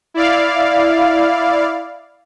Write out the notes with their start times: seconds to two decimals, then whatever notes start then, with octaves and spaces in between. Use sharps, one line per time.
0.14 E4 D5 F5